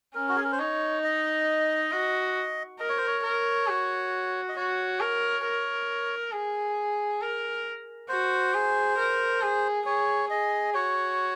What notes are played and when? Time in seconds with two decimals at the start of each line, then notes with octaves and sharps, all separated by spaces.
0.15 C#4 A#4
0.29 F#4
0.36 G#4
0.44 A#4
0.52 C5
0.59 D#4 C#5
1.04 D#5
1.92 F#4
2.80 A#4 D#5
2.89 C#5
2.98 C5
3.07 C#5
3.23 A#4
3.68 F#4
4.49 D#5
4.56 F#4 C#5
5.01 A#4
5.45 A#4
6.32 G#4
7.22 A#4
8.09 F#4 C5
8.54 G#4
8.98 A#4
9.42 G#4
9.86 G#4 C#5
10.30 G#4 D#5
10.74 F#4 C#5